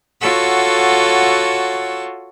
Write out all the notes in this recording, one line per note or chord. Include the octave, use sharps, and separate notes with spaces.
F4 F#4 A4 C#5 F#5 E6